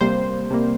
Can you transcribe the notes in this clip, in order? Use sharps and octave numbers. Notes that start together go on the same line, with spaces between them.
C3 G3 A#3 C5
C3 G3 A#3